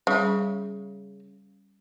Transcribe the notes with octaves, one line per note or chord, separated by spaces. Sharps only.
C#3 G3 C#4